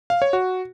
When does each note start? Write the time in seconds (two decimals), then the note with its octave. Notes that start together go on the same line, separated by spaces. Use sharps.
0.10 F5
0.22 C#5
0.33 F#4